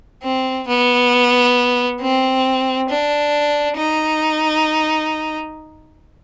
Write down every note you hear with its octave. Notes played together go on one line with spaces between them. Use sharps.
C4
B3
C4
D4
D#4